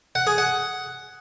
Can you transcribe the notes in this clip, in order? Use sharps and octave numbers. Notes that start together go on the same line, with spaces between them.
F#5
G#4
F#5